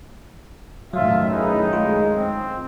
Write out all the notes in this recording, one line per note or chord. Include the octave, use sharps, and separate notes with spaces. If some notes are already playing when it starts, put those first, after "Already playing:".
F#2 D#3 F#3 A3 F4 E5
D#4 E4 G#4 B4
G#3 F4
C4